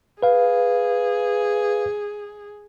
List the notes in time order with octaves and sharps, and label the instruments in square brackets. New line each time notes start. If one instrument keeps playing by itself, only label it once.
[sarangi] G#4 [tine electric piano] B4 F5